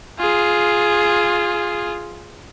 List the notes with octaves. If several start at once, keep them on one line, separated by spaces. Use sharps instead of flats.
F4 G#4